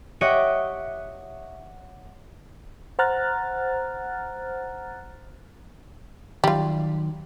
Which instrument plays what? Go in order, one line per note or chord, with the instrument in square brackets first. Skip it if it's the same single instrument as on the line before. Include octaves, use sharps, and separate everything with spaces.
[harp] G4 C#5 D#5 E5 F#5 G5
[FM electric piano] C5 F#5 A#5 F6 F#6 A6
[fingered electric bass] D#3 F#3 [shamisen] G3 F4